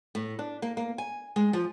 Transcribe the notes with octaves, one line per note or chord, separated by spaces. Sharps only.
A2
D4
A#3
A#3
G#5
G#3
F3